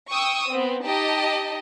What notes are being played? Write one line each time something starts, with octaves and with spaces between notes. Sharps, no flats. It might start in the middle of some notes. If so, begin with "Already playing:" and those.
G5 C#6 D#6 E6
B3 C4
D#4 G4 D#5 A5